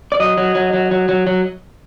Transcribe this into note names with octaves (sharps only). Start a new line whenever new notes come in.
D5
F#3 D#5
F#3
F#3
F#3
F#3
F#3
F#3